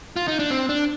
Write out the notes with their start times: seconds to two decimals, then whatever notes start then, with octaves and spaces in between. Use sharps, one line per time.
0.16 F4
0.28 D#4
0.39 D4
0.51 C4
0.69 D4